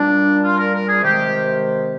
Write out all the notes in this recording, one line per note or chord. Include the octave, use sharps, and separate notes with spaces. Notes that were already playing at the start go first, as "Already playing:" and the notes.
Already playing: A#2 G3 D4
F4
A#4
A#4
G#4
C3 D#3 G#3 G4